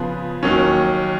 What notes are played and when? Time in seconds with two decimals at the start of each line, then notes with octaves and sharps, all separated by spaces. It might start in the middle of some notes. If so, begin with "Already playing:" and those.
Already playing: C#3 F3 B3 F4 G#4
0.43 D#2 D#3 F#3 C#4